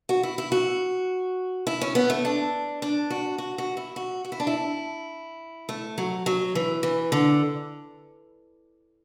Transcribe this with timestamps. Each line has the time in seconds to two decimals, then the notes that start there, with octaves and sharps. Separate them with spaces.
0.09 F#4
0.23 E4
0.38 E4
0.52 F#4
1.67 E4
1.81 C#4
1.95 B3
2.10 A3
2.25 D4
2.82 D4
3.10 F#4
3.38 F#4
3.58 F#4
3.77 E4
3.96 F#4
4.25 F#4
4.32 E4
4.40 D4
4.47 E4
5.69 A3
5.98 F#3
6.26 F#3
6.55 E3
6.83 E3
7.12 D3